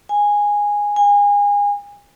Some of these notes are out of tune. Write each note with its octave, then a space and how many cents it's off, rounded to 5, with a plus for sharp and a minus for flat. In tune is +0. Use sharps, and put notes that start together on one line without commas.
G#5 -10
G#5 -30